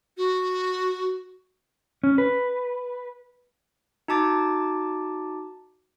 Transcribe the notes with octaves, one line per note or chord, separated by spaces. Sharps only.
F#4
C#4
B4
D#4 F#4 A5 D6 A6